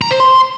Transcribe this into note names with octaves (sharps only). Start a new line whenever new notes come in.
A#5
C5
C6